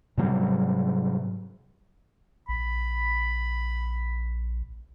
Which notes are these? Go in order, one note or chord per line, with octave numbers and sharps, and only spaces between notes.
G#2 C3 F#3 G3
A#1 B5